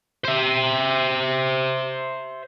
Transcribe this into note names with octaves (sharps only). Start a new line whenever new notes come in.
C5 E5